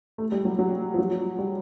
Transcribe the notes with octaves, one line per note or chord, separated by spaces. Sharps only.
A3
G3
F#3
F#3
F3
F#3
G3